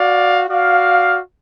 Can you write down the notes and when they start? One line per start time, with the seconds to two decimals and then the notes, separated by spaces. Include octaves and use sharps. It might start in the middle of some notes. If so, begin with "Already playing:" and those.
Already playing: F#4 D5 F5
0.48 F#4 D5 F5